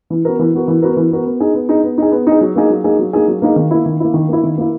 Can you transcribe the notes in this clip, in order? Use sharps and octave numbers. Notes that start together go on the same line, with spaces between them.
E3
B3 F#4 A#4
E3
B3 F#4 A#4
E3
B3 F#4 A#4
E3
B3 F#4 A#4
B3
D#4 G#4
B3
D#4 G#4
B3
D#4 G#4
B3
D#4 G#4
F#3
A#3 D#4 G#4
F#3
A#3 D#4 G#4
F#3
A#3 D#4 G#4
F#3
A#3 D#4 G#4
D#3
A#3 E4
D#3
A#3 E4
D#3
A#3 E4
D#3
A#3 E4